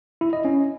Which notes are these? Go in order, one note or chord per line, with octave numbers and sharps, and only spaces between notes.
E4
D#5
C#4